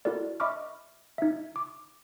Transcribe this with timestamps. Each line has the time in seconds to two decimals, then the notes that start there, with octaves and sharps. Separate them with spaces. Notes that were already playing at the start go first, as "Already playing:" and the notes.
0.05 E4 F#4 A4 A#4 D5
0.40 D#5 E5 B5 C#6 D6 F6
1.18 D#4 E5
1.56 D6